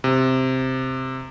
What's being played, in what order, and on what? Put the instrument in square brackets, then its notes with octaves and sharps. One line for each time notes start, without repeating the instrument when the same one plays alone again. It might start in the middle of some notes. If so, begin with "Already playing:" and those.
[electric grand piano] C3